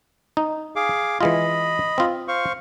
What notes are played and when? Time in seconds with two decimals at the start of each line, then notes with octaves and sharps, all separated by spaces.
0.37 D#4
0.76 G#4 F5 D6
1.21 E3 G#3 F4 D#5 B5
1.98 C4 F4
2.28 C5 F5 C#6